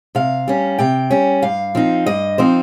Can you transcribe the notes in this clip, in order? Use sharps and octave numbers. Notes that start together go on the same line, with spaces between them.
C3 F5
G3 C#4
C3 G5
G3 C#4
G2 F5
F3 C4 D#4
G2 D#5
F3 C4 D#4 C5